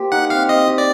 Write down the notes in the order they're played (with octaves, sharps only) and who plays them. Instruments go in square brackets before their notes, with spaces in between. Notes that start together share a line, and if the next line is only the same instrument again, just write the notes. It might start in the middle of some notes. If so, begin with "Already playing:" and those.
Already playing: [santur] A#3 G4 C5
[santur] D#4 [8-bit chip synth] F#5
[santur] C4 [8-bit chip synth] F5
[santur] C4 [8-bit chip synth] D#5
[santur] G4
[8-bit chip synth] D5